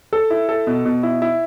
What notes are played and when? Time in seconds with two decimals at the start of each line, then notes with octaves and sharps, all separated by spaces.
0.13 A4
0.30 E4
0.49 A4
0.67 B2
0.85 B2
1.03 E4
1.22 E4